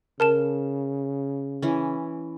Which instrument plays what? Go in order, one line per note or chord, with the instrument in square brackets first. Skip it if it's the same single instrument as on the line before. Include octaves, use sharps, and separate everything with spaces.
[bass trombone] C#3 [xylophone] A#4 A5 E7
[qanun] E3 C#4